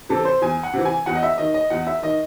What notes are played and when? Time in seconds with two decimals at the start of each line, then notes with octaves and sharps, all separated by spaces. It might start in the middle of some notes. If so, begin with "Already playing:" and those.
0.09 C3 E3 A4
0.25 C5
0.42 E2 G#5
0.63 F#5
0.74 C3 E3
0.85 G#5
1.06 E2 F#5
1.15 D#5
1.23 E5
1.38 D#3 D#5
1.54 D#5
1.70 E2 F#5
1.87 E5
2.02 D#3 D#5